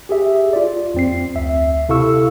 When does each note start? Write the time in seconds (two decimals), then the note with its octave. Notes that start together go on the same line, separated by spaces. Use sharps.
0.09 G4 G#4 E5
0.53 F4 D5
0.94 F2 C4 C7
1.35 D2 E5
1.89 C3 E4 A4 F5 C#6 E6